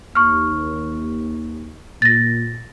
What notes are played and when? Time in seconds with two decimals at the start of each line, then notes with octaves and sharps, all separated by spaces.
0.15 D#2 C#6 F6
2.02 A#2 A6 A#6